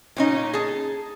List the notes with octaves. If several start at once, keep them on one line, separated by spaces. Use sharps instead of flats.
A#2 C#4 D#4
G#4 A5